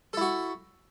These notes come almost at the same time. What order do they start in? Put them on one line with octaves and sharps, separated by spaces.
A4 E4 F#4